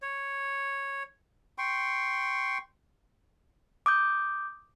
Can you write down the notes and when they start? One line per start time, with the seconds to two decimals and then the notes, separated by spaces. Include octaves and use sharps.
0.02 C#5
1.58 G5 C6 C#6
3.86 D6 D#6 G6